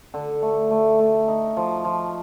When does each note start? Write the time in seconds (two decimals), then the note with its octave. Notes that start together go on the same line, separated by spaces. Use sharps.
0.14 D3
0.42 A3
0.71 A3
1.00 A3
1.28 D#4
1.57 F3
1.85 F3